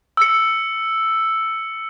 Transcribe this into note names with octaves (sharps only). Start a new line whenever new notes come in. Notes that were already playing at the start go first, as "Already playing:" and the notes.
E6 C#7